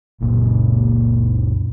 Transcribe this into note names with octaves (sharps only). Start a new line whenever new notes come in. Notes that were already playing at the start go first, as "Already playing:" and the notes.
F#1 C#2 A#2